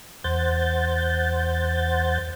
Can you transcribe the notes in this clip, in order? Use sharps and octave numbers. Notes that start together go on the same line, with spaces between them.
E2 C5 F#5 G6 A6